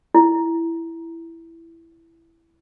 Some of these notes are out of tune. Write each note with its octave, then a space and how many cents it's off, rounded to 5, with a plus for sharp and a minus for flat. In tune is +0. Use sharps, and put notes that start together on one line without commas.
E4 +10